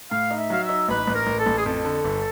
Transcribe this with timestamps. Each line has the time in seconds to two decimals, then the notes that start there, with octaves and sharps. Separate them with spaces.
0.11 A2 F5
0.31 D#4
0.37 E5
0.50 F#3 F5
0.63 E5
0.69 D#4
0.89 A1 B4
1.08 A1
1.15 A#4
1.27 A1
1.39 A4
1.46 A1
1.58 G#4
1.66 F2 A4
1.85 D3
2.04 G1